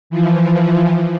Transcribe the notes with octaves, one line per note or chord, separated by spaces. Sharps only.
E3 F3